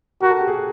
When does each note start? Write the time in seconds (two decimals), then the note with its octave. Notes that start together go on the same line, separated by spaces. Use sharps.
0.21 F#4 A#4
0.30 A4
0.39 G4
0.48 G#4